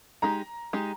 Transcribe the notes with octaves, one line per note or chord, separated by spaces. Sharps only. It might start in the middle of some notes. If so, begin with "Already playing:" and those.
G#3 D#4 G4 A#5
G#3 D#4 G4